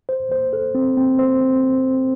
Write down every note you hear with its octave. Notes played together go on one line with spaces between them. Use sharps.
C5
C5
A4
C4
C4
C5
C4